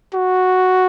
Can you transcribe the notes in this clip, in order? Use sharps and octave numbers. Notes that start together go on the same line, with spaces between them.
F#4